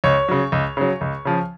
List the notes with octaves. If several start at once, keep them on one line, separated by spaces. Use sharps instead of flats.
C#2 C#5
C#3 F#3
C#2
C#3 F#3
C#2
C#3 F3